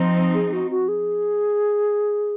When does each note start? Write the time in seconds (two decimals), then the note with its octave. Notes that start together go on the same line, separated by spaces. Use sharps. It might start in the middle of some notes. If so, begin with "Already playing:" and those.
Already playing: F3 C4 D#4
0.34 G#4
0.53 F#4
0.71 F#4
0.88 G#4